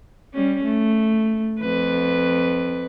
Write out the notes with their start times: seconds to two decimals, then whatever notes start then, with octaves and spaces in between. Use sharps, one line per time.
0.34 G3 C#4
0.64 A3
1.61 F2 B4